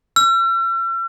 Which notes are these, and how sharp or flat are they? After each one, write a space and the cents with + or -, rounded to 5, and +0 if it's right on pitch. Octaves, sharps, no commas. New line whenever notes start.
E6 +45